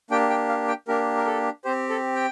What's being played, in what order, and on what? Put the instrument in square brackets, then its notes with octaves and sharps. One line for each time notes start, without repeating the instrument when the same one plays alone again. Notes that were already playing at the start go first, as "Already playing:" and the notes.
[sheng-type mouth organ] A#3 D4 G4 G5
G5
F5
G5
A#3 D4 G4 A#4
A#4
A4
C4 G4 C5
A4
G5